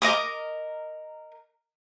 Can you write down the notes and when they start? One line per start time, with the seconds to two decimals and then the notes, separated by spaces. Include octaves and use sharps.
0.02 A#4 D#5 D6 D#6